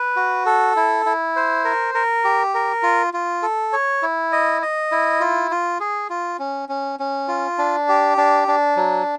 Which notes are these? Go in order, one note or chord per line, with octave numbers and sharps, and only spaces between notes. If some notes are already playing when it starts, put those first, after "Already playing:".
Already playing: B4
F#4
A4
E4
E4
C5
A#4
A#4
G4
A#4
F4
F4
A4
C#5
E4
D#5
D#5
E4
F4
F4
G#4
F4
C#4
C#4
C#4
F4
D4
G4
D4
D4
F#3